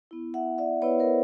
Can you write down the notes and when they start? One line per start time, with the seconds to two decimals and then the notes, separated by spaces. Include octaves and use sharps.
0.11 B3 E4
0.34 E5 F#5
0.58 D5 E5
0.82 B3 E4 B4 C#5
0.99 A#4 C5